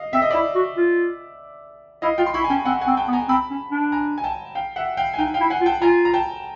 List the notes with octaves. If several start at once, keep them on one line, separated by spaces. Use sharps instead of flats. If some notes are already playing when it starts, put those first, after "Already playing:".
Already playing: D#5 F5
C4 E5
D#5
E4 D5 E5
F#4
F4
E4 D#5 F5
F4 F5 G5
C6
E4 B5 C#6
G#5
C#4 G5 A5
C4 F#5 G#5
F#5 G#5
C4
G5 A5
B3
G#5 A#5
C4 A5 B5
C#4
D4
G#5 A#5
G#5
G5 A5
F5 G5
E5 F#5
F5 G5
G#5
D#4 F5 G5
F5 G5
E4
F#5 G#5
F4
G5 A5
F4 G#5 A#5
A#5
G5 A5